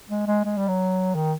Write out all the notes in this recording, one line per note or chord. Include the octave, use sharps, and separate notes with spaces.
G#3
G#3
G#3
G3
F#3
D#3